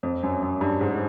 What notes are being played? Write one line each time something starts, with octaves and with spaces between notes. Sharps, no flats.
F2
F#2
F#2
G2
G#2